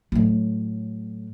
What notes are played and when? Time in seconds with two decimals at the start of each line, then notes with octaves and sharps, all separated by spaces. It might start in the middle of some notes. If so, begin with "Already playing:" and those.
0.12 A2 F#3